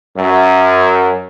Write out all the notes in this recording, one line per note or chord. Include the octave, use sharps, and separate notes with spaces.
F#2